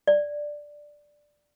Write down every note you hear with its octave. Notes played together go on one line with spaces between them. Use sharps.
D5